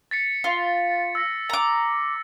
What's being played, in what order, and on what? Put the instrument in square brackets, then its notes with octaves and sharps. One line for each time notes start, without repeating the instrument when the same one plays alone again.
[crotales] A6 B6 C#7
[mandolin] F4
[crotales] E6 A#6 B6
[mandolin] A#5 D6